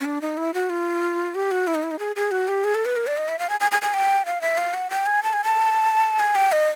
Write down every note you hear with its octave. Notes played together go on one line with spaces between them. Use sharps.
C#4
D4
D#4
E4
F#4
F4
G4
F#4
E4
D#4
E4
D#4
G#4
G#4
F#4
G4
G#4
A4
B4
A#4
D5
D#5
E5
F5
G#5
G#5
G#5
G#5
G5
F5
E5
F5
F#5
G5
G#5
A5
G#5
A5
G#5
G5
D#5